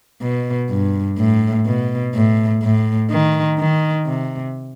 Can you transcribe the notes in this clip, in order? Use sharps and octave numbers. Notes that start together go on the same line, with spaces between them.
B2
G2
A2
B2
A2
A2
D#3
D#3
C3